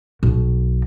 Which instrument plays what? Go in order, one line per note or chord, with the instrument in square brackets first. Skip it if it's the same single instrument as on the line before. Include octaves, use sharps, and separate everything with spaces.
[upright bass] B1